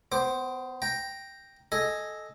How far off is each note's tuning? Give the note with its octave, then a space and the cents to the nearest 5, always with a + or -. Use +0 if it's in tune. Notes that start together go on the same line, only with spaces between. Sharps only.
B3 +35 C5 +0 D6 +0
G5 +0 A#5 +0
A4 -15 D#5 +0 G#5 +0